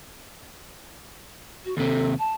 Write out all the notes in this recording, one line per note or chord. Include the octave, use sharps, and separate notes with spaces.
F#4
D#2 C3 A4
A5